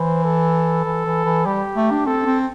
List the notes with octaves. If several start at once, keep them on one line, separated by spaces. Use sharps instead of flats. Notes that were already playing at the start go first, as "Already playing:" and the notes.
Already playing: E3 C5
A4
E3
E3
E3
G3 G4
A3
D4
C4 A4
C4